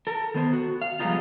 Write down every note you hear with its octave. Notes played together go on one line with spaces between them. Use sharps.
A4 A#4
D#3 B3 C5
F#4
F5
F3 G3 G#3 B3 D#4 F4